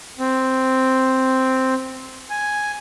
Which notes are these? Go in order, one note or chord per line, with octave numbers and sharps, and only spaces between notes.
C4
G#5